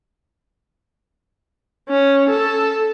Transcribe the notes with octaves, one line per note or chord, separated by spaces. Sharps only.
C#4
A4